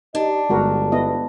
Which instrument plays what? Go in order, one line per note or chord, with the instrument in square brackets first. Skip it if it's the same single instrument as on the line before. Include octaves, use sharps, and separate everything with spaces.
[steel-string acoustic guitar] D4 [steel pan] D#4 [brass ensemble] G4 D#5
[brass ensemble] G1 [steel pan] G#3 F#4 A#4
[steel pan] B3 E4 D#5